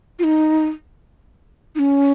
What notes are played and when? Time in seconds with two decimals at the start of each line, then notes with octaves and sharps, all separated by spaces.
0.19 F4
0.24 D#4
1.75 D#4
1.79 C#4